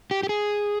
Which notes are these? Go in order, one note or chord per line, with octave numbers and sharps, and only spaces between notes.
G4
G4
G#4